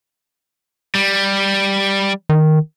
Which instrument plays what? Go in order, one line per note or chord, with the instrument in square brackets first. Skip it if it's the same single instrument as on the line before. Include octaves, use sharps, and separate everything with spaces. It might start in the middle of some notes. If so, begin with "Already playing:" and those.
[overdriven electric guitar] G3
[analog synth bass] D#3